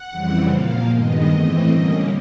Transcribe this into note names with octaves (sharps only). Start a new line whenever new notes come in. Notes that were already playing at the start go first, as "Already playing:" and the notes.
Already playing: F#5
F2 C#3 E3 G3 C4
A#2 F3 A#3 F5
G2 D#3 G#3 B3 D#5
A2 E3 A3 C4
D3 G3 A#3 C#4